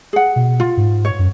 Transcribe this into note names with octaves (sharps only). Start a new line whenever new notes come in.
G#4 F#5
B2
F4
G#2
C#5
F#2